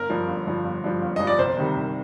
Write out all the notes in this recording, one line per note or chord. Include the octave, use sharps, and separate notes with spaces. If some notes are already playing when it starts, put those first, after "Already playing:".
Already playing: G1 A#4
G2 F3
G1
G2 F3
G1
G2 F3
G1
G2 F3 D#5
D5
C2 C5
C3 D#3 G3
C2